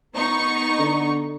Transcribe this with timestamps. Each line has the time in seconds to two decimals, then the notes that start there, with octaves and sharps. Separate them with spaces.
0.15 B3 D#4 C#6
0.79 D3